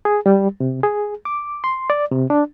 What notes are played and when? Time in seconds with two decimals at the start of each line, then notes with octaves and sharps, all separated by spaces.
0.05 G#4
0.26 G3
0.60 C3
0.83 G#4
1.25 D6
1.64 C6
1.90 D5
2.12 C3
2.30 D4